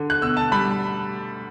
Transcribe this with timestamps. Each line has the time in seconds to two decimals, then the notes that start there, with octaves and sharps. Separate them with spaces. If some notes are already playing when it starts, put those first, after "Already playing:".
Already playing: D3
0.10 F#6
0.22 B2 E6
0.37 A5
0.52 G3 B5